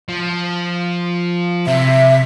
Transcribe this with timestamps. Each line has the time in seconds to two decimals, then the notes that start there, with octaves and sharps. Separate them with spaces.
0.08 F3
1.67 C3 E5